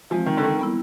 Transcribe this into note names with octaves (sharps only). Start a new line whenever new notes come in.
E3 F3 G#3 C4
D#3
D3
D#3
G3 B3 E4